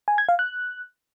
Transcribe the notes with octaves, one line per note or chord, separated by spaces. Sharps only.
G#5
G#6
F5
F#6